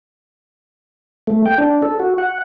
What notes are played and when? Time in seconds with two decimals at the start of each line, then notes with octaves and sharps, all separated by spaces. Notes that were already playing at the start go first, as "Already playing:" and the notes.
1.27 A3
1.46 G5
1.58 D4
1.82 A4
1.99 F#4
2.18 F#5